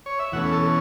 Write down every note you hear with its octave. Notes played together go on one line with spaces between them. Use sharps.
C#5
E5
E2 B2 A3 C#4 F#5
A4